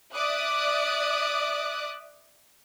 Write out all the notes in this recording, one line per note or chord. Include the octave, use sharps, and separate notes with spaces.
D5 E5 D6 D#6 F#6